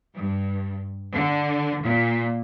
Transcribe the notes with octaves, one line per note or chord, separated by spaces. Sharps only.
G2
D3
A#2